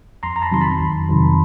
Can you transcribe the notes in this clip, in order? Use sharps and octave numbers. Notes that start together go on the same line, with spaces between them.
F2 A#5 C6
A#5
A5 B5
C3 D#3 F#3 C6
A5 B5
F2
C3 D#3 F#3